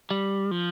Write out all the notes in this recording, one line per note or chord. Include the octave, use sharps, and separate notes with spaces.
G3
F3